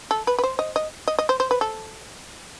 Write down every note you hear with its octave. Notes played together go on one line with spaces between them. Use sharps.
A4
B4
B4
C5
D#5
D#5
D#5
D#5
C5
C5
B4
A4